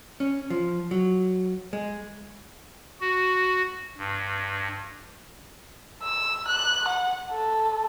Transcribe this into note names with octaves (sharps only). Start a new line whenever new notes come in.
C#4
F3
F#3
G#3
F#4
G2
E6
F#6
F#5
A4